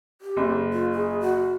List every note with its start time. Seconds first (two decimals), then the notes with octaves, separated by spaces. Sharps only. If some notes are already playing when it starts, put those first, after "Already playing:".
0.21 G4
0.37 F#1
0.72 F4
0.92 G#4
1.20 F#4